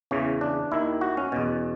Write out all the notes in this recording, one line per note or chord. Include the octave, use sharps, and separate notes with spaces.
E2 C#3 E3 C#4
D4
D#2 D#3 E4
F#4
C#4
E2 B2